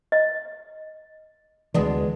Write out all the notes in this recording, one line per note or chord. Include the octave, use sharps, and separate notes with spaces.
D#5
D2 E3 G#3 B3 D4